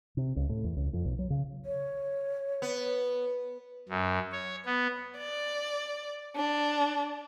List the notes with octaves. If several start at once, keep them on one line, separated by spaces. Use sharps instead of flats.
C3
C#2
A2
E2
C#2
F2
B1
F#3
C#3
C#5
B3
F#2
C#5
B3
D5
D4